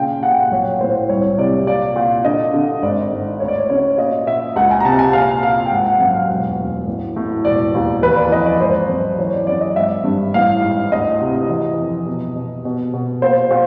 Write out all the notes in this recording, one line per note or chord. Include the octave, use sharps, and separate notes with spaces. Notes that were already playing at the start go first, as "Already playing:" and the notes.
Already playing: A#2 C#3 G5
A#2 F#5
G5
F#5
B1 C#5
A2 C5
C2 C#5
C3 D5
A#2 D5
A#2
D3 D#5
D3
G#1 D5
G#2
D2 C#5
D5
C#5
C#3 C#5
A#2 D#5
A#2 E5
C#2 F#5
G#5
A#5
C3 A5
G#5
A#2 F5
A#2 F5
G5
G#1 F#5
F#5
F#2 F#5
F5
E1
D2
A1
A2
E1 D5
D#2
E3 B4
D5
F2 D#5
D5
G#1 C5
F#2
E3 C#5
D5
F#2 D5
D#5
G#1 E5
G2
A1 F5
G#2
D2 D#5
C3
E3 D#5
F2
B2
B2
B2
B2
A#2 C5
A#2